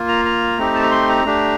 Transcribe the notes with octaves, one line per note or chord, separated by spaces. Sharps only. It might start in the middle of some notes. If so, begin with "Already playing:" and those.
Already playing: A#3 F4
A#5
A#5
A3 C4 D#4 G4
A5
A#5
C6
A#5
A3 D4 G4